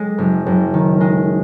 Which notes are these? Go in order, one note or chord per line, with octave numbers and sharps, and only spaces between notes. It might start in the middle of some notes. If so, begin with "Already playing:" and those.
Already playing: G#3
F#1
F#1
D#3
G#3